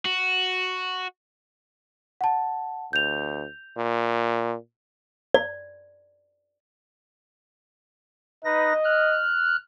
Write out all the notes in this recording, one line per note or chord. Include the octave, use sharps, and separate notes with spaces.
F#4
F#5 A5
D2 G6 F7
A#2
D5
D#4 B4 D#5 A#6
F6 F#6